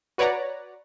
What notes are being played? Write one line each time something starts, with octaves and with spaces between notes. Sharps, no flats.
F#4 B4 C#5 D5 F#5 A#5